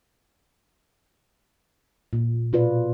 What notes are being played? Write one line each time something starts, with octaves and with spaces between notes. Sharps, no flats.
A#2
B2 F4 B4 D5